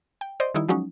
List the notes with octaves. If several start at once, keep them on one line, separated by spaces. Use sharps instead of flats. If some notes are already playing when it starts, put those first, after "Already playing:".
G5
C5 D5 D#5 C6
D#3 G3 D#4 E4
F3 F#3 G#3 C#4 D#4